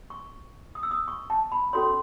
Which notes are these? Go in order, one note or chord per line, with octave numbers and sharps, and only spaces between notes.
C#6
D#6
E6
D#6
C#6
A5
B5
C#4 F#4 A4 C#5 C6